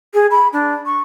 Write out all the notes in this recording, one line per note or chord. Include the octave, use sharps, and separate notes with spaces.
G#4
B5
D4
C#6